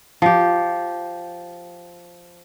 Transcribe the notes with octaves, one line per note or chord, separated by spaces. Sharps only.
F3 G4